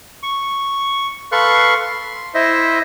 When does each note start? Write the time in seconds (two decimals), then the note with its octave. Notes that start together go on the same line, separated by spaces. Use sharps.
0.23 C#6
1.32 A4 B4 F5 C6 C#6 F#6
1.82 C6
2.34 E4 C5 D#5 E5